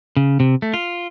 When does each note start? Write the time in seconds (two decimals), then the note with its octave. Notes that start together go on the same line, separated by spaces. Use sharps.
0.17 C#3
0.40 C3
0.62 A3
0.74 F4